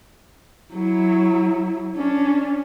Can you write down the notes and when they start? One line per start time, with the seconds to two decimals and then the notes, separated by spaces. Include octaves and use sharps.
0.73 F#3 E4
1.97 C#4 D4